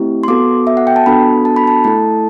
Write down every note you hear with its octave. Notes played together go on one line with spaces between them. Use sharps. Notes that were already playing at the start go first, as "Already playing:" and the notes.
Already playing: A3 C4 E4 G4
C6
B3 F#4 A4 D6
E5
F#5
G5
A5
B3 D4 F#4 A4 B5
A5
B5
A5
A3 E4 A4 A5